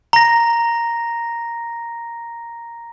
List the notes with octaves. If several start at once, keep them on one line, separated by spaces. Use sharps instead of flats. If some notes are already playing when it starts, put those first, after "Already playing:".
A#5 A#6